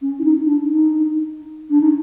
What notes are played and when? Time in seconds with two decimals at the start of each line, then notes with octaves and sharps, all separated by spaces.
0.01 C#4
0.19 E4
0.24 D#4
0.46 D4
0.69 D#4
1.70 D4
1.81 D#4